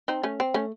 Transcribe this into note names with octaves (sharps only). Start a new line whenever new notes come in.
C4 D#4
A3 C#4
C4
A3 C#4